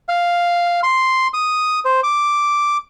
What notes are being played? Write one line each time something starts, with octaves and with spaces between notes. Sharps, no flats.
F5
C6
D#6
C5
D6